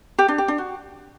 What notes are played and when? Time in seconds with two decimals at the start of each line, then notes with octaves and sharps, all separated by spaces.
0.19 G4
0.28 D4
0.38 G4
0.48 D4
0.58 F#4